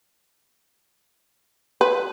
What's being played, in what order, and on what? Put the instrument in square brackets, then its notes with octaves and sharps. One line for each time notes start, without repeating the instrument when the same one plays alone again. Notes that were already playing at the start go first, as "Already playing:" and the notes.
[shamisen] B4